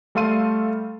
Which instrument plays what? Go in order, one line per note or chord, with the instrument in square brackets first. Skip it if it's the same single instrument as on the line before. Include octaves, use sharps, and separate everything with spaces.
[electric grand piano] G3 A3 A4 F5 C6 D#7